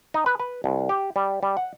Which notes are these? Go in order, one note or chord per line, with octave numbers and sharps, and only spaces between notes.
D#4
B4
B4
C2
G4
G3
G3
F#5